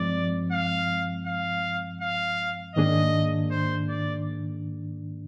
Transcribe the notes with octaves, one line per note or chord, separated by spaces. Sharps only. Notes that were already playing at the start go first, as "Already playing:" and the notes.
Already playing: G2 F3 G#3 C4 D5
F5
F5
F5
G#2 D#3 A#3 D4 G#4 D#5
C5
D5